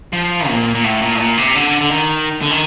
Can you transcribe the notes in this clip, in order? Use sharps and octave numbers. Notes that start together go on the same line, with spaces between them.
F3
A#2
A#2
A2
A#2
A2
A#2
C3
D3
D3
D#3
D3
D#3